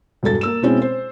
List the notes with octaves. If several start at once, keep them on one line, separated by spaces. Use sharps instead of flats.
E1 G2 A4 A6
A#3 E6 E7
B2 G#3 C4 C#4 E4
C5